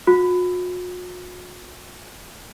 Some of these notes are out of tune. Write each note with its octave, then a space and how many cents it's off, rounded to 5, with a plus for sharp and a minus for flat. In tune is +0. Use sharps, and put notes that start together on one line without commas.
F#4 -45